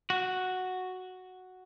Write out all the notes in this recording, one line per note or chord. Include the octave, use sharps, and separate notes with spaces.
F#4